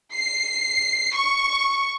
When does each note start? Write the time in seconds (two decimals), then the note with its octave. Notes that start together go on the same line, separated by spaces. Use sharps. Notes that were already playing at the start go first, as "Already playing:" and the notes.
0.13 C7
1.14 C#6